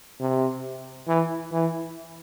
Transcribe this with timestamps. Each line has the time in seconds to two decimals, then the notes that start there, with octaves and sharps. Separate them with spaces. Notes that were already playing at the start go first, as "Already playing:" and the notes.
0.20 C3
1.07 E3
1.52 E3